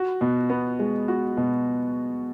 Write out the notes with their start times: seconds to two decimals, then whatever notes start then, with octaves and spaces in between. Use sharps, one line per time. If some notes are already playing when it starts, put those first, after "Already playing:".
Already playing: F#4
0.21 B2
0.50 B3
0.79 G#3
1.08 F#4
1.37 B2